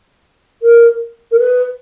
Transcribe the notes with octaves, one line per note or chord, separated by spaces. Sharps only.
A#4
A#4
B4